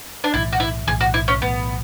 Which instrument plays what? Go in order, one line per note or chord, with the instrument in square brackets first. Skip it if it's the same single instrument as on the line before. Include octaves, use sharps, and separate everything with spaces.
[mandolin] D4
[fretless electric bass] B1 A2 E3 [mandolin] E4
[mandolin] F#4
E4
[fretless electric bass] B1 A2 E3 [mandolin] G#4
[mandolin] F#4
E4
C#4
[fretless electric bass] B1 A2 E3 [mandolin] B3